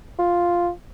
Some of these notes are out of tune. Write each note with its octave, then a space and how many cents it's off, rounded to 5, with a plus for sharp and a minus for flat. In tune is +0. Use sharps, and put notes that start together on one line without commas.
F4 +0